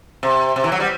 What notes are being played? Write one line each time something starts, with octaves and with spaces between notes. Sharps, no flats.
C3
C3
E3
F#3
G3